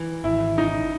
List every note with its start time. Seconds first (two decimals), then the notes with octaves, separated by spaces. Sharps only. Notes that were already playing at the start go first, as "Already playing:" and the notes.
Already playing: E3
0.24 G#1 E4
0.57 C#3 D#4